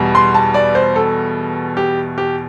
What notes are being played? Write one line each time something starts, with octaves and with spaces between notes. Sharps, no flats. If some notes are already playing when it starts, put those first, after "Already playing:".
Already playing: E2 B2 G3
C6
A5
D5
C5
A4
G4
G4